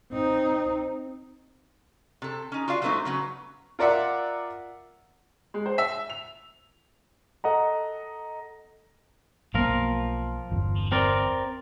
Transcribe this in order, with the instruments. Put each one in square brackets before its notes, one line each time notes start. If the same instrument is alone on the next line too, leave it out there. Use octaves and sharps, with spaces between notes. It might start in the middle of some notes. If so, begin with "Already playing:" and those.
[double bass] C4 D#4
[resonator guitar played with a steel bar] C3 A4
C#4 D#4
F4 F#4 D5 F5
F#3 G#3 A3 B3 C4 D#4
C#3 F#3 B3
[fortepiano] F4 A#4 D5 E5 F#5
[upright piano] G#3
C5
E5
F7
[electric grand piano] A4 D#5 F#5 A#5
[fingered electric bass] B1 A#3 B3 [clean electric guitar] F3 F4 A#4
[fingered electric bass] G1 E2
[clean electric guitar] C4 A#4 D5